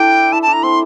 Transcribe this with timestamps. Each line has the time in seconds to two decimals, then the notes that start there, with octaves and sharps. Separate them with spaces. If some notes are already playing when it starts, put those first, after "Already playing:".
Already playing: D4 E4 A4 G5
0.32 E4 A5
0.42 D4 A5
0.53 A#5
0.62 C4 C6